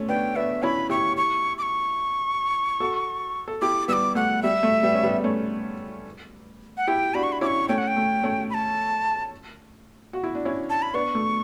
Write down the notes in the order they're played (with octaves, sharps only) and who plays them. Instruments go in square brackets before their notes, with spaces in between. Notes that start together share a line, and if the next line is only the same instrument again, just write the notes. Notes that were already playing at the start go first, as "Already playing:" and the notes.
Already playing: [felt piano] A3 C#4
[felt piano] B3 D4 [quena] G5
[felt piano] B3 D4 [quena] E5
[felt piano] C#4 E4 [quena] B5
[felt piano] E4 G4 [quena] C#6
[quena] C#6
D6
C#6
[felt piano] F#4 A4
A4
[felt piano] E4 G4 [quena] D6
[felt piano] G3 B3 [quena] E6
[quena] D6
[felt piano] A3 [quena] F#5
[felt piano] G3 [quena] E5
[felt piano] A3
G3 B3
C#4
G3 B3
A3 C#4
[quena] F#5
[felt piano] E4 G4 [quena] G5
[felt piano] D4 F#4 [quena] B5
[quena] C#6
B5
[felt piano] C#4 E4 [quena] D6
[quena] C#6
[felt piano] A3 C#4 [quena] G5
[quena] F#5
G5
[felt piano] A3
A3 C#4
[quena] B5
A5
[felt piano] F#4
E4
D4
C#4 E4
[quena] A5
B5
[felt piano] B3 D4 [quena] C#6
[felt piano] A3